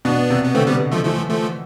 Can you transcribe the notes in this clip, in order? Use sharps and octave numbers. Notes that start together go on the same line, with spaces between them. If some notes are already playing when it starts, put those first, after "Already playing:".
B2 B3 D4
C3
B3
D3 A3 C4
G3 B3
F3 A3
E3 F3 A3
F3 A3